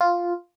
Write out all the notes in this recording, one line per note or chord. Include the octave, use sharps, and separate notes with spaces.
F4